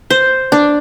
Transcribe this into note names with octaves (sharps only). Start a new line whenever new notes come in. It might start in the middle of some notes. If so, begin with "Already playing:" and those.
C5
D4